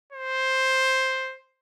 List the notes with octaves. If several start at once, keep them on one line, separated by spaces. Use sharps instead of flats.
C5